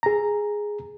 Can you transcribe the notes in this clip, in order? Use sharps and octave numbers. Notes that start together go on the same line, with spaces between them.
G#4 A#5